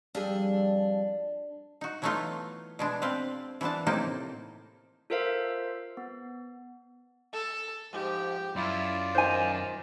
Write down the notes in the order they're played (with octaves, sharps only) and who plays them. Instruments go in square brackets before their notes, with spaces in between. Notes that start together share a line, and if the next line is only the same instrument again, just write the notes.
[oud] F2 G3 G#4 [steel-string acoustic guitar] D4
[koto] D#4 F#4
E3 F#3 A3 B3 D#4 F4
B2 G#3 D4
C4 B4 D5 F5
E3 F3 B3 D4 A5
A2 C3 A#3 D#4 C5 G5
[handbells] F4 A4 A#4 C5 E5 F5
B3
[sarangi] A4
[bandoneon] G#2 F3 [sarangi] G4
[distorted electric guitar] F#2 [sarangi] E4 [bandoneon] F4 D5
[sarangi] D#3 [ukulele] C5 G#5